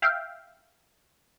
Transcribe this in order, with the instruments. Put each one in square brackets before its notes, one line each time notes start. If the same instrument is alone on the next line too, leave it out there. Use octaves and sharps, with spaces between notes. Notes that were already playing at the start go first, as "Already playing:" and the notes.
[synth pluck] E5 F5 G5